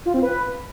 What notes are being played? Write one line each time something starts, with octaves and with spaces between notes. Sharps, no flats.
F4
C4
B4